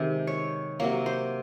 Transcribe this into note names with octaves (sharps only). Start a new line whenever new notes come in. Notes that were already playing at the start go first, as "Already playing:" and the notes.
Already playing: C3 D#3 G#3
C#5
C3 F#3 A#3 C#5
C5